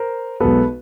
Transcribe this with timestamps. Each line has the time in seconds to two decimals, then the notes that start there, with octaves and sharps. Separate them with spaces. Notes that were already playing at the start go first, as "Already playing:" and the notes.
Already playing: A#4 C5
0.40 B1 B2 G#3 B3 A4 B4